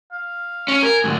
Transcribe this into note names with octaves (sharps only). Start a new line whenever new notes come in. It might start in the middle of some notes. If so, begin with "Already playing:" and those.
F5
C#4
A#4 G#5
D2 G#2